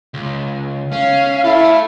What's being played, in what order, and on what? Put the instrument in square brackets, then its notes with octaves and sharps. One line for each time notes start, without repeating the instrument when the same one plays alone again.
[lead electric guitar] C#2
[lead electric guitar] C#4 [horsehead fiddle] F5
[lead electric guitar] A3 A4 [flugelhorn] E4